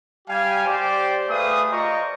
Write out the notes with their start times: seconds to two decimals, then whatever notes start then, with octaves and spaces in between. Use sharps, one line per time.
0.28 G3 G4 F5 G5 G#5
0.65 G4 C5 D5
1.28 A3 G4 G#4 B4 F5 D#6
1.70 F4 C5 D5 D#5 A#5 C#6